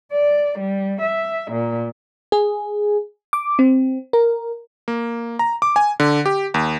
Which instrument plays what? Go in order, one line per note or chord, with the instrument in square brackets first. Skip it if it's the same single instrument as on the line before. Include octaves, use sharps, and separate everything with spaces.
[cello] D5
G3
E5
A#2
[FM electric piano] G#4
D6
C4
A#4
[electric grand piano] A#3
A#5
D6
G#5
D3
G4
D#2